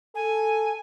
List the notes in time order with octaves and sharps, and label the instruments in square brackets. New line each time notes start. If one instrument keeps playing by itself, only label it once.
[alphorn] A4 [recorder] G#5